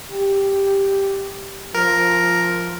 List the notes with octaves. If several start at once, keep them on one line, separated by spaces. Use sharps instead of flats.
G4
F3 A#4